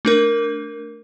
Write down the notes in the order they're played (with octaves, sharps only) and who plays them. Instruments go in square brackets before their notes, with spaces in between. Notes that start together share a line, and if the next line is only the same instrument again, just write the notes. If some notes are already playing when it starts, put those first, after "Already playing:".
[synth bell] A3 D4 A#4